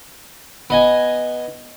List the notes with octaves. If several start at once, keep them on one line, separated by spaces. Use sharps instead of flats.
B3 D#5 G#5